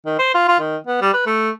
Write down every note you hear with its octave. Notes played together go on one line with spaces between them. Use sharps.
D#3
C5
F4
F4
D#3
B3
G3
B4
A3